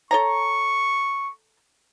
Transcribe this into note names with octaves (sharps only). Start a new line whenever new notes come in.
A4 C#5 A#5 C#6